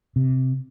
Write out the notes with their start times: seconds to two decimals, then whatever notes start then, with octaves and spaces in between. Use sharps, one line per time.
0.16 C3